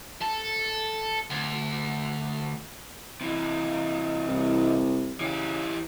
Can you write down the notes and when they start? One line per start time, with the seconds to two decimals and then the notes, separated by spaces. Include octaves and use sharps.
0.22 A4
1.31 D2
3.21 C3 E3
4.28 C2
5.20 C#3 E3 G4